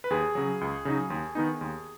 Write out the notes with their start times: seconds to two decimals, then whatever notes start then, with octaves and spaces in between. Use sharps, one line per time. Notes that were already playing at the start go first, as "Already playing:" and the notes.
0.04 B4
0.10 D#2 G#4
0.35 C#3 F#3
0.61 C#2
0.85 C#3 F#3 D#4
1.10 D#2
1.35 D#3 B3 D#4
1.61 D#2